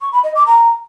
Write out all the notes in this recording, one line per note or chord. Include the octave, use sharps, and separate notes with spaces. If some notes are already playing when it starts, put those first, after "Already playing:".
C#6
B5
D#5
D6
A#5